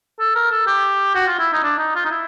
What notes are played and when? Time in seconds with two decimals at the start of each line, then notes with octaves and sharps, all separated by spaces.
0.20 A4
0.36 A#4
0.51 A4
0.67 G4
1.15 F#4
1.27 F4
1.39 E4
1.53 D#4
1.63 D4
1.79 D#4
1.95 F4
2.05 D#4
2.11 E4